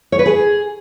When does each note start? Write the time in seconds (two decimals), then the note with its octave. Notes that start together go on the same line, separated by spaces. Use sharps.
0.12 C#5
0.19 B4
0.26 G#4